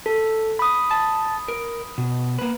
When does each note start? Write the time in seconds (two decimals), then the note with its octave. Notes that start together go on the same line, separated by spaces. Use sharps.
0.06 A4
0.59 B5 D#6
0.91 A5
1.48 A#4
1.98 B2
2.39 A#3 B4